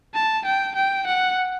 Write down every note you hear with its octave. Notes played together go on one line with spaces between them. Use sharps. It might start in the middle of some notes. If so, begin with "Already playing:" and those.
A5
G5
G5
F#5